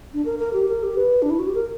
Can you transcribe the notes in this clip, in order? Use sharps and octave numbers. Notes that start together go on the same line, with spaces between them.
D4
A#4
A#4
G4
A#4
G4
B4
D4
E4
F#4
G4
A#4